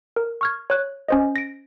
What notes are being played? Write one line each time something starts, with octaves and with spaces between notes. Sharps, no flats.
A#4
C#6 F6 G#6
C#5 F#6
C#4 C5 D#5
A#6 D7